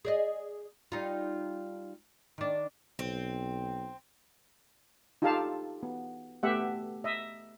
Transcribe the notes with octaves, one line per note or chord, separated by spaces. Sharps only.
G#4 D5 D#5
G3 D#4 F4
D#3 D4
B1 C4
D#4 F4 G4 A4 F5 A5
B3
A3 B3 G4 E5 F#5
D#5 E5